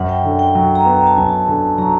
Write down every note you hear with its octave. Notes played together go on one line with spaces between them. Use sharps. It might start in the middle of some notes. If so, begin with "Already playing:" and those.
Already playing: F#2 F#5
G5
D3 G5
G5
F#3
A#5
B3
A#5
A5
F#2 G#5
A5
D3
F#3 A#5